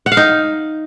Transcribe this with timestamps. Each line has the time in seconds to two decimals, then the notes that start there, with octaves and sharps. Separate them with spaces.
0.06 F#5
0.12 F5
0.17 D#4